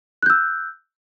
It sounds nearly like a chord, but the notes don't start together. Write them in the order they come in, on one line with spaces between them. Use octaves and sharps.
F#6 G6 E6